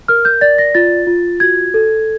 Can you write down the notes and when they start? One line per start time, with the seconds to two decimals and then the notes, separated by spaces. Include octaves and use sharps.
0.08 A#4 F6
0.25 G6
0.41 D5 A6
0.58 A#6
0.75 F4 A6
1.07 F4
1.40 F#4 G#6
1.74 A4